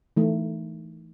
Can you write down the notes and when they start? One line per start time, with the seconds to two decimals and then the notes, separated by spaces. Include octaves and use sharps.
0.17 E3 A3 D#4